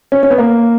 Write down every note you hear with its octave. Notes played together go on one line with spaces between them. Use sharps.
C#4
C#4
B3
A#3